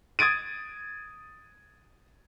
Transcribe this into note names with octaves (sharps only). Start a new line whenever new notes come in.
D#6 G#6 A6 D7 D#7